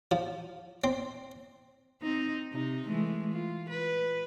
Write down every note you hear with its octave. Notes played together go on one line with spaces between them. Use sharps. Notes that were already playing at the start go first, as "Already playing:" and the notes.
F3
C4
C4 D#4
C3 D#4
E3 G#3 A3
F4
B4